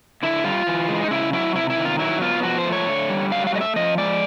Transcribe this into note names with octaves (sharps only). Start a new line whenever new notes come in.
D3 E4
G3 F4
E3
G#3
D#4
C#3 E4
F#3 E4
C3 E4
E4
D#3
F4
F#3 E4
B3 F4
F3 F#4
C5
A3
C#5
D3
G3
F#3 F5
F5
A3 D#5
E5
F3 D#5
G#3 D5